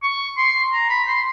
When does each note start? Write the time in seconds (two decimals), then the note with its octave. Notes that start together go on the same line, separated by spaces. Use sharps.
0.03 C#6
0.37 C6
0.73 A#5
0.90 B5
1.07 C6